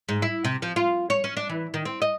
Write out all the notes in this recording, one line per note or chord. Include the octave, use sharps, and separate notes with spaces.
G#2
E4
C3
F3
F4
C#5
C#4
D4
E3
D#3
C4
D#5